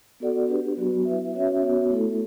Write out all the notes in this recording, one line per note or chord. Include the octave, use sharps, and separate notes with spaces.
B3 F#4 A4 D5 F#5
D4 G4 B4
F#3 B3 F#4
E4 B4 E5
C#4 F#4 C#5 E5
B3 F#4 C#5
A3 E4 A4